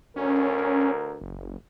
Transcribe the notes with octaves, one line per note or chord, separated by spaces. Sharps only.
D2 C#4 A#4
F#1